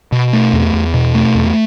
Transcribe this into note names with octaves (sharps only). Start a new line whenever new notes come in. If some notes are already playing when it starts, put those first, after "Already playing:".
B2
A3
E2
E2
B2
A3
E2